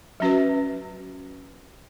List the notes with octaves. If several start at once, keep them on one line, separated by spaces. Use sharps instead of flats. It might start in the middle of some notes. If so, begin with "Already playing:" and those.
F#3 C#4 F#4 B4